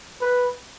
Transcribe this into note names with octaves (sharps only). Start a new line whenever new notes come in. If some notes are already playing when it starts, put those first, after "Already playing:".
B4